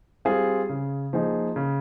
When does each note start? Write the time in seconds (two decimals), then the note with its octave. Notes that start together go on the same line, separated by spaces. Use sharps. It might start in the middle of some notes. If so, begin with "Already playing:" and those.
0.25 G3 C4 F4 G#4
0.69 C#3
1.13 F3 A#3 D#4 G#4
1.56 C#3